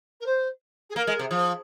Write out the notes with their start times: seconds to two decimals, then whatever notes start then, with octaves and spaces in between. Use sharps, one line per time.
0.20 A#4
0.26 C5
0.90 G#4
0.96 A#3 A#4
1.07 G#3
1.19 C3
1.31 F3